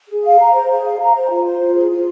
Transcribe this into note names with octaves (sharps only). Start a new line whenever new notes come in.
G#4
F5
A#5
C5
G#4
F5
A#5
C5
F4
C5
F4
G#4
F4